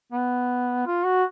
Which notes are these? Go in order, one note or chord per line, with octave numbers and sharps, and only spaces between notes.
B3
F4
F#4